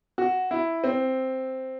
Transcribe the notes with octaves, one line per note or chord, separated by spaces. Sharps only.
F#4
E4
C4